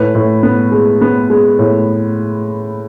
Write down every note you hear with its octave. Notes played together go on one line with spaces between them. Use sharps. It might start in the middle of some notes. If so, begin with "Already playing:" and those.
Already playing: A2 B4
A2
B3
G#3
B3
G#3
A2